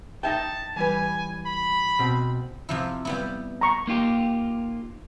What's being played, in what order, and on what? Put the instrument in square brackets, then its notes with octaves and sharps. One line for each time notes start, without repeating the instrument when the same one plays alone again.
[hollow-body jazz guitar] D#4 E5 G5 [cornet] A5
[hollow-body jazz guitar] E3 G3 B4 [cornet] G#5
[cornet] B5
[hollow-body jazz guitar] B2 C4
[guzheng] C3 F3 E4
G3 B3 E4
[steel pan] A#5 C#6
[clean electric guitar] A#3 D#4 F4 G4